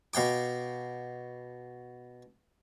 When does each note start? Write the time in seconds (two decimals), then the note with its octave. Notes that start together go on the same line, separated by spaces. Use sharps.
0.14 B2 F5 G5 D6